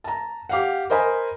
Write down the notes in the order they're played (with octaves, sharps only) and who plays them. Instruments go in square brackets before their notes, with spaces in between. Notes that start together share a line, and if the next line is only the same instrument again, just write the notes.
[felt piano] A5 A#5
G4 F5 F#5
A#4 C5 D#5 G#5 B5